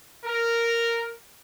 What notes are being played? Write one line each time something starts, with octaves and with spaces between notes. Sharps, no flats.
A#4